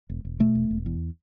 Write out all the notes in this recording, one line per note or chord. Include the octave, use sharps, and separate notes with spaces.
E1
E1
B2 A3
E1
E1
E2